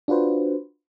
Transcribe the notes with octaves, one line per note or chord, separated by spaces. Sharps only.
D4 F4 F#4 B4 C5